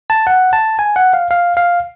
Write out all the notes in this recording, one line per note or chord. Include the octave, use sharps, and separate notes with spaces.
A5
F#5
A5
G#5
F#5
F5
F5
F5